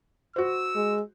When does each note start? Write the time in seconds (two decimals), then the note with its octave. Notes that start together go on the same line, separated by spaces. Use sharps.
0.36 F#4 C5 E6
0.76 G#3